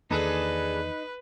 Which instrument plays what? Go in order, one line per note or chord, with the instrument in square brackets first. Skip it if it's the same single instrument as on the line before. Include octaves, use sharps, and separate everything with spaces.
[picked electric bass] E2 D#3 A#3 [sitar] D4 G#4 A4 [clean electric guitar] D#4 [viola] B4